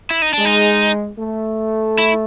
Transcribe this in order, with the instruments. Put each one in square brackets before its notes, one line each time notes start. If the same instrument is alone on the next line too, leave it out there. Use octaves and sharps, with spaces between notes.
[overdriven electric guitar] E4
D#4
[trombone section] G#3 [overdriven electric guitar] D4
[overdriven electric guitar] D#4
[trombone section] A3
[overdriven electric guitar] E4